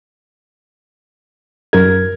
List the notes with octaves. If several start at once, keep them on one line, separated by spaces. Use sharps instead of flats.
F#2 A#4 G#6